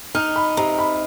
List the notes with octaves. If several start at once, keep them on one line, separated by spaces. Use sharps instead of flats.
D#4 F6
B5
C3 A#5
B5